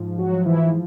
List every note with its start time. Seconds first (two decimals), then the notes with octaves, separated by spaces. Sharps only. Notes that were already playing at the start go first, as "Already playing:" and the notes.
Already playing: G#2 F3
0.18 F#3 F#4
0.32 F3
0.45 E3 E4